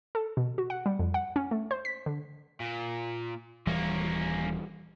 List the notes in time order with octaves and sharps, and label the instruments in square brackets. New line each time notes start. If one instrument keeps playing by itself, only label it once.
[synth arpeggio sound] A4
B2
F#4
F#5
G3
F2
F#5
C#4
A3
C5
B6
D3
[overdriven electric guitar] A#2
[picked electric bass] D#1 E3 G3 [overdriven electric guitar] A#3 C#4